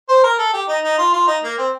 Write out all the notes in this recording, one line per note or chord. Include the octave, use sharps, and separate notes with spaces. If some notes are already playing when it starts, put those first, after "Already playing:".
C5
A#4
A4
G4
D#4
D#4
F4
F4
D#4
A#3
C4